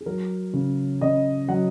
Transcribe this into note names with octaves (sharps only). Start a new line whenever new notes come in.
G#4
F#3 A#4
C#3
C#3 D#5
F#3 F#5